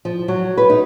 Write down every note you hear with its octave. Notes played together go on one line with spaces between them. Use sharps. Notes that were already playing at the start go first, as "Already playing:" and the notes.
F3
F#3
B4
D#4